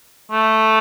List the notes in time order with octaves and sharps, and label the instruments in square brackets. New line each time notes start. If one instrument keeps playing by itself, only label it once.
[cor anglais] A3